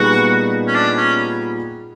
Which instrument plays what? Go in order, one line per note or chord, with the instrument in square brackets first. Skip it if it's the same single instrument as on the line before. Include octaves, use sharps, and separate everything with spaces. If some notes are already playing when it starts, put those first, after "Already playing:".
Already playing: [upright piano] A#2 G3 B3 D#4 G#4 [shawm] F#4
[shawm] C#4
D4
C#4